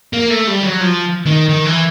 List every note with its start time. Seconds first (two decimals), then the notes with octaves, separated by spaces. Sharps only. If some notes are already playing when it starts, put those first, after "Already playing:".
0.13 A#3
0.30 A3
0.48 G3
0.63 F#3
0.81 F3
1.26 D#3
1.49 D#3
1.66 E3